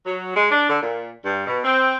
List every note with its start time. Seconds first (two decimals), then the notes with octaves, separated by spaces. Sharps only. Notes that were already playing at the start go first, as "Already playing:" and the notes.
0.06 F#3
0.35 G#3
0.50 D4
0.69 D3
0.82 A#2
1.25 G2
1.47 B2
1.64 C4